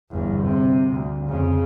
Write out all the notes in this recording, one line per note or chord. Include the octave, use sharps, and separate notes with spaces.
G1 E2
C3
D2
F2 C#3